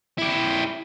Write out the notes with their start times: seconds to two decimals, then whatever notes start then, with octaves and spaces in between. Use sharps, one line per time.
0.18 E4 G4